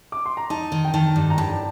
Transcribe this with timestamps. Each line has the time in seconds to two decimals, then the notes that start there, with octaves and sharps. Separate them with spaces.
0.12 D6
0.26 C6
0.37 A#5
0.50 D#4 A5
0.72 D#3
0.85 G5
0.94 D#3 A5
1.16 G2
1.30 A#5
1.38 G2 A5